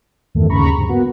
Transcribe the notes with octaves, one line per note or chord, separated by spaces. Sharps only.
E2 G2 D#3 A3
G1 D#2 C#3 A#5 B5 C#6
G2 C3
A#3 B3 F#4